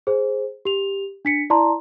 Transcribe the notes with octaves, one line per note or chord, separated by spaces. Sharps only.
G#4 C5
G4 F7
D4 B6 C#7
E4 D5 A5 A#5 C6